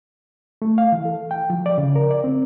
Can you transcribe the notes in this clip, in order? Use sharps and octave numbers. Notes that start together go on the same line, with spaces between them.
A3
F5
E3
A4
G5
F3
D5
C#3
A#4
D5
C4